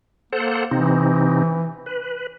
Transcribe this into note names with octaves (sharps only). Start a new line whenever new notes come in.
A#3 A4 C5 F#5
C3 E3 C4 D#4
B4